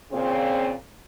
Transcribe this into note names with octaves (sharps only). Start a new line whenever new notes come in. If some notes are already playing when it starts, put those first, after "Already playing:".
A#2 C#3 C4